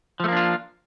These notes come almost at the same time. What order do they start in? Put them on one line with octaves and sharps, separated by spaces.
F3 A3 A#3 D4 F4